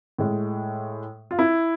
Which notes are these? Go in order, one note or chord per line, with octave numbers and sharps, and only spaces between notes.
A2 G#3
F4
E4